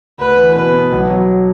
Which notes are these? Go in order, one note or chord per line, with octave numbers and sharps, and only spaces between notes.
D2 B4
E3
B2 B4
B3
B1
F#3